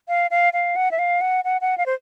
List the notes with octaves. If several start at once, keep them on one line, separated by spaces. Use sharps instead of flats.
F5
F5
F5
F#5
E5
F5
F#5
F#5
F#5
F5
C5